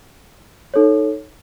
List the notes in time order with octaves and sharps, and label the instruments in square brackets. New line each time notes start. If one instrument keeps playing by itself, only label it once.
[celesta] D#4 A4 C#5